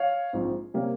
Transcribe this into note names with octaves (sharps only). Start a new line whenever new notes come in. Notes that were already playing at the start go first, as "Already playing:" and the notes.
Already playing: C#5 F5
A#1 G#2 F3 C4
C3 G3 A#3 C#4